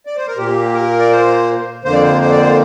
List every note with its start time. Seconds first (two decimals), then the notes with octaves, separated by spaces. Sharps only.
0.06 D5
0.16 C5
0.27 A#4
0.37 A#2 A#3 G4
0.74 A#4
0.99 D5
1.11 C5
1.84 F2 D3 A#3 C5
1.93 D5
2.03 C5
2.21 C5
2.31 D5
2.41 C5